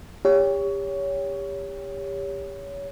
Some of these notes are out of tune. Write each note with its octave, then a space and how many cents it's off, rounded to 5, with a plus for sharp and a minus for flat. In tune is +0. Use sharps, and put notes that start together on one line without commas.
G4 +30 C#5 +20